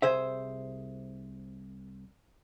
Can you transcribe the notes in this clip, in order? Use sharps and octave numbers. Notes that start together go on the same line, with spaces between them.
C2 G#4 C5 E5